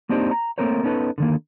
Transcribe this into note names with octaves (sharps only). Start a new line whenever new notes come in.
A#3 C4 D4 D#4 G4 C5
A#5
A3 A#3 C4 A#4 C5 C#5
B3 C#4 D#4 A4 B4
D3 D#3 A#3